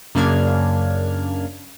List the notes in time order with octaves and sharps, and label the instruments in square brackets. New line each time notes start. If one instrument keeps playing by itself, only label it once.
[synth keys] F#2 C#3 A#3 D4 F6 G#6